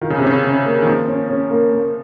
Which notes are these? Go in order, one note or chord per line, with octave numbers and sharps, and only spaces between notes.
D#3 F4
C#3
C3
C#3 C#4
C#4
A#3
D#3
F3 A#3
C#4
C#4
A#3
A#3